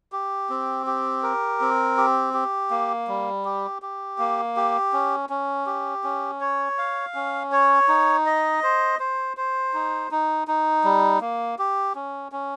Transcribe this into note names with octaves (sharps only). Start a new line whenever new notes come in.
G4
C4
G4
A#4
C4
G4
G4
A#3
G3
G4
G4
A#3
G4
C#4
C#4
G4
C#4
C#5
F5
C#4
C#5
D#4
D#5
C5
C5
C5
D#4
D#4
D#4
G3
A#3
G4
C#4
C#4